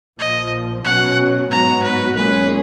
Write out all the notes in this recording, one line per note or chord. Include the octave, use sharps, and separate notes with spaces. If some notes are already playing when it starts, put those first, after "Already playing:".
A#1 A#2 F3 D#5
B2 F#3 C#4 F#5
G#2 F#3 B3 F#4 A#5
B4
B1 A#2 G#3 C#4 G#4 B4